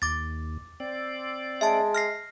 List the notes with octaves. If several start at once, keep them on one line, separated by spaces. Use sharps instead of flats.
D#2 D6 A6
C4 D5
G#3 E5 A5
F6 A#6 C7